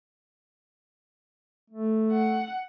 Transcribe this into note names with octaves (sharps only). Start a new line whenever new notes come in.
A3
F#5